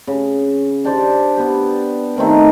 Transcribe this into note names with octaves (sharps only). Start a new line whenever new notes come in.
C#3
D4 G4 C5 D5
B3 G4
D#3 A3 C4 A#4